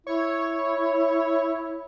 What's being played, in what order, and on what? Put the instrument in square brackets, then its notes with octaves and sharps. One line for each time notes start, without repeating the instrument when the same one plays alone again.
[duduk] E4 [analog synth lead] C#5